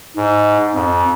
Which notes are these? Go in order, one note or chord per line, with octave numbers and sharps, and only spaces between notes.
G#2
F2